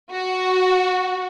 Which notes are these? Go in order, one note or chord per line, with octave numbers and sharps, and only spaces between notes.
F#4